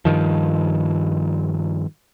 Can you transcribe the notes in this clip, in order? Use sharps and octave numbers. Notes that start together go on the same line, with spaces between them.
G2 D#3 F3